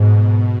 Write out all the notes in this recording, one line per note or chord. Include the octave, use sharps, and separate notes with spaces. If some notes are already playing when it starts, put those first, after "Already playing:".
Already playing: G#2 B2